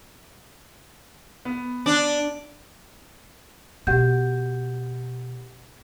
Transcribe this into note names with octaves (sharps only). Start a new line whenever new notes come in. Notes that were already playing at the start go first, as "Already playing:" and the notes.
B3
D4
B2 G4 F#5 G6